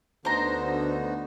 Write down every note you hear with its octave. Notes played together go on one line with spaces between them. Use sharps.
D2 D3 B3 D#4 F#4 C5 A#5